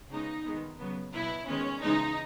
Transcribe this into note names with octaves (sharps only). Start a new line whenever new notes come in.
C#3 G#3 B3 D#4
D#3 G#3 B3
C#3 F#3 B3
B2 F#3 B3 E4
D#3 G#3 B3 C#4
C#3 E3 G#3 B3 D#4